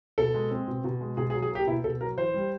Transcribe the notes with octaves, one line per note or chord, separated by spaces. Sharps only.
B2 A4
G#3
C4
B2
B2
G#3
B2 G#4
G#4
F#3
G#4
A#3 G4
B2 E4
B2 A4
F#3 A#4
E3 C5
G3